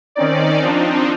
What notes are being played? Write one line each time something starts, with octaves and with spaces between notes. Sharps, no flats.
D#3 C4 C#4 D#4 D5
F3 C4 D4 D#4